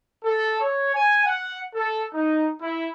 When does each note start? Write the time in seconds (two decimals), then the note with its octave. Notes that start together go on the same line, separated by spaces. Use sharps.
0.22 A4
0.60 C#5
0.93 G#5
1.25 F#5
1.73 A4
2.13 D#4
2.59 E4